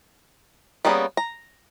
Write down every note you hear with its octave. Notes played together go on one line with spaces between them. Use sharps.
G3 A#3 B3 C#4 G#4
A#5